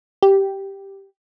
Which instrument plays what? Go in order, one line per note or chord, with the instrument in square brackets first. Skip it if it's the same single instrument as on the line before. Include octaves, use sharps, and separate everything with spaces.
[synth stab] G4